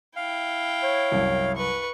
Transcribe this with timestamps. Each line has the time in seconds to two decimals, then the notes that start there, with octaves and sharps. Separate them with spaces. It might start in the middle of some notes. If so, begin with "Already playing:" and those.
0.16 E4 F5 G5
0.83 C#5
1.12 C2 F#2
1.56 B4 C#6